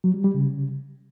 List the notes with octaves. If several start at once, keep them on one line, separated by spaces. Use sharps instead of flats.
F#3
G3
G3
C#3